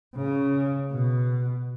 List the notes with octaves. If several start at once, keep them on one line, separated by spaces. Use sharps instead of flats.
C#3
B2